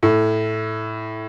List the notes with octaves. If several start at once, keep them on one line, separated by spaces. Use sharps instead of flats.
A2